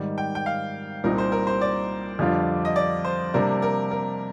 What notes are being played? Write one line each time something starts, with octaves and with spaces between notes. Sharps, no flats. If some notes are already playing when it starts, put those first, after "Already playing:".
Already playing: G#2 D#3 G3
G5
G5
F5
C2 A#2 G3 C4 D#4 A#4
C5
A#4
C5
D5
F2 D3 G3 D4 F4
D#5
D5
C5
C3 G3 A#3 D4 A#4
A#4
A#4